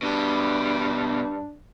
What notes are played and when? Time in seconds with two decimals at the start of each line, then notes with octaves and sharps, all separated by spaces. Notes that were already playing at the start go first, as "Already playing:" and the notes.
0.02 G2 B2 D4 G4